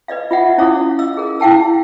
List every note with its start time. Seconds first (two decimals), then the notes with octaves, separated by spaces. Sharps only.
0.08 B4 D5 D#5 F5
0.31 F4 E5 F#5
0.58 C#4 E4 C#5 F5 D6 D#6
0.99 D#5 F5 E6
1.17 G#4 A#4
1.40 E4 F5 G5 A5 E6